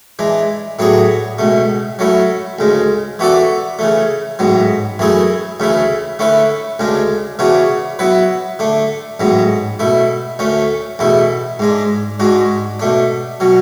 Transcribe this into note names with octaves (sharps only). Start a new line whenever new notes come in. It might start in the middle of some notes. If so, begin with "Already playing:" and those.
E3 G#3 D4
A2 F#3 B3 D4 G#4
C#2 B2 A3
F#3 A3 C#4 E4
D2 C#3 G#3
E3 B3 F#4 A4 D5
C#3 E3 A3
A1 G#2 F#3 B3
F#2 E3 A3 E4 G#4
D2 C#3 E3 A3 E4
D3 A3 C#4 E4 B4
D2 C#3 G#3 D4
C#3 E3 B3 D4 F#4
F#3 B3 E4 B4
D3 A3 D4
A1 G#2 F#3 B3
B2 A3 E4
D2 D3 A3 C#4
E2 B2 A3 E4
G#2 G#3 D4
G#2 G#3 D4 F#4
B2 A3 D4
B2 F#3 C#4